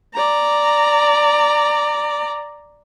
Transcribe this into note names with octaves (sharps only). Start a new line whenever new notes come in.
D5 A#5